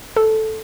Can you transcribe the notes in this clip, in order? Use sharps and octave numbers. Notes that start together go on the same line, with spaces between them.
A4